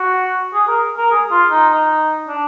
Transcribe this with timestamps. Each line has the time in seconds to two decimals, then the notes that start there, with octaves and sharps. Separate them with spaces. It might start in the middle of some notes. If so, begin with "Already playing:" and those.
Already playing: F#4
0.54 G#4
0.68 A#4
0.97 A#4
1.11 G#4
1.31 F4
1.51 D#4
1.69 D#4
2.28 D4